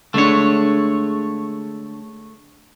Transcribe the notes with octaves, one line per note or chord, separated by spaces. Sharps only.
D3 G#3 A3 D4 C#5